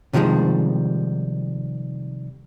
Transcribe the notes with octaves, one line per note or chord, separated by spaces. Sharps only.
C3 D#3 F3 G3 G#3